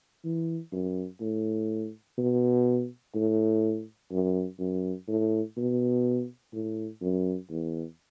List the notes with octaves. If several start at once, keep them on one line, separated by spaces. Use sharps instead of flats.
E3
F#2
A2
B2
A2
F#2
F#2
A2
B2
A2
F#2
E2